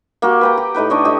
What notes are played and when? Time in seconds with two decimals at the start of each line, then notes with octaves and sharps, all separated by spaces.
0.22 A#3 F#4 G4
0.41 B4 G5 A#5
0.57 G4
0.74 A2 D#4 B4 G5
0.90 D4 C#5 D#5
1.05 G4 D#5